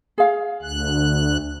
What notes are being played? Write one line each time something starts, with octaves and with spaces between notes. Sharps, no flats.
G#4 F5
D2 F#6